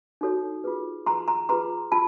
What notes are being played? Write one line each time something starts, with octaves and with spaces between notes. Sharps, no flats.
D#4 F#4 A4 C#5
F4 G#4 B4
F4 G#4 B4 A#5 C6
A#5 C6
F4 G#4 B4 A#5 C6
F4 A5 B5